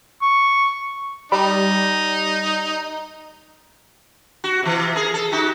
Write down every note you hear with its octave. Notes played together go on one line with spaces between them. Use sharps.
C#6
G3 D#4
F#4
C3 E3
G#4 A#4
A4
D#4 F#4 G4